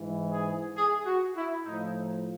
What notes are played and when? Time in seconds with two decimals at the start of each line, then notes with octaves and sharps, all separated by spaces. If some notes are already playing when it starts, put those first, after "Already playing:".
Already playing: G#2 E3
0.31 G#4
0.75 G#4
1.05 F#4
1.36 E4
1.65 A2 F3 D#4